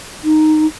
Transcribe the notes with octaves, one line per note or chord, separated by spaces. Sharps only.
D#4